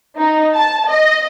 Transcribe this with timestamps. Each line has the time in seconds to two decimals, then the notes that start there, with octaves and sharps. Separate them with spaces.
0.17 D#4
0.55 A5
0.88 D#5